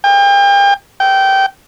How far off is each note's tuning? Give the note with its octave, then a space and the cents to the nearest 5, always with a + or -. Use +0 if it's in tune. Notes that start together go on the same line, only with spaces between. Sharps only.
G5 +35
G5 -20